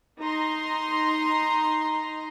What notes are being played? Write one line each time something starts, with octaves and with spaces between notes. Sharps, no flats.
D#4 A#5 C6